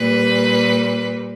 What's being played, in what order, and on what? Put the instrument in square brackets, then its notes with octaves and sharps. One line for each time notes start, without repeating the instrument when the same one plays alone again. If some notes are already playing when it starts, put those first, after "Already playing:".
Already playing: [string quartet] A#2 G3 B4